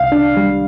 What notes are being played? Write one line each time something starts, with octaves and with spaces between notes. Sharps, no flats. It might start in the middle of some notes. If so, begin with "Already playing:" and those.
Already playing: C2 F5
D4
G3